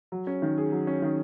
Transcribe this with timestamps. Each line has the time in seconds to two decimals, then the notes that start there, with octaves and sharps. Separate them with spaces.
0.12 F#3
0.27 C#4
0.42 D#3
0.58 G#4
0.72 F#3
0.87 C#4
1.02 D#3